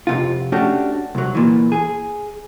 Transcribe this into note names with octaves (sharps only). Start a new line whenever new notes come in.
F2 C3 F4
A3 C#4 D4 F#4 G4
C2 F#3
A#2 E3
G#4